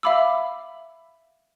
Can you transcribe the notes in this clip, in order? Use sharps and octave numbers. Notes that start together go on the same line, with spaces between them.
E5 F5 B5 D6 E6